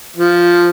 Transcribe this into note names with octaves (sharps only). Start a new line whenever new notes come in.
F3